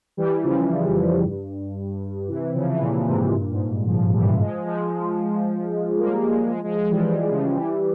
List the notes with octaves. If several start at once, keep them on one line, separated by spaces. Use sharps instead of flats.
E3 G3
C#3 F3
F2
F2
G2
C3 E3
C#3 F3
E3
A#2 C#3
G#2 C3
G2 A#2
G#2
G2
C#3 F3
E3 G3
F3 G#3
F3 G#3
G3 A#3
A#3
F3 G#3
F3 G#3
F3 G#3
F3 G#3
E3 G3
E3 G3
C#3 F3
E3 G3